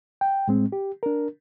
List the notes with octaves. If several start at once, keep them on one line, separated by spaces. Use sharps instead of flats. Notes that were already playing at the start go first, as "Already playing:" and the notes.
G5
A2 G#3 C4
G4
D4 A#4